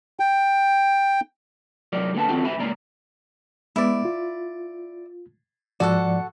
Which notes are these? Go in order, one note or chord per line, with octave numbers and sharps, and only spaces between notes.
G5
C2 F#3 A#4 D5
D3 A#3 B3 F#5 A5
D#3 C4 F4 F#4 A4
G2 E5 G#5 B5
C#2 G#2 A#3 D5 A#5
G#3 B3 E4 D5
F4
G#2 F3 F#4 A4 D5 F#5